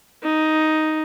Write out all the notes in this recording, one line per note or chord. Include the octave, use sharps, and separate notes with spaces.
D#4